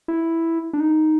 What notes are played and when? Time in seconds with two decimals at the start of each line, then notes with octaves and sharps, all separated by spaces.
0.08 E4
0.73 D4
0.80 D#4